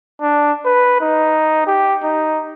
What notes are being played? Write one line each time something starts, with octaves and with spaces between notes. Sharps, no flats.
D4
B4
D#4
G4
D#4